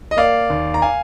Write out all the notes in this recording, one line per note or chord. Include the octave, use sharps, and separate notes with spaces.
D#5
A#3 D5 F5
D#2
A#5
F5 G#5